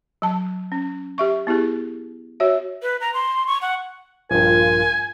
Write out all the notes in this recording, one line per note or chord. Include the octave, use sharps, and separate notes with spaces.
F#3 A5
C#4
G4 E5 C#6
B3 E4 G4 G#4
F#4 C#5 E5
B4
A#5
C6
C#6
F#5
A#1 G2 F4 A#4 G#5